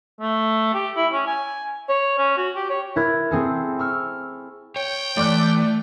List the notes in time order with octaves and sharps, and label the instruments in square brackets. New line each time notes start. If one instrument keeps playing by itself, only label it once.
[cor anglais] A3
G4
E4
C#4
G#5
C#5
C#4
F#4
G4
C#5
[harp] E4 A#4 F#6 G#6
C4 G#4 A4
C#6 E6 F6
[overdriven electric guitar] C#5 [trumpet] G5
[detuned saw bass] E3 [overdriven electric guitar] A3 [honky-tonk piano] D5 D6 F#6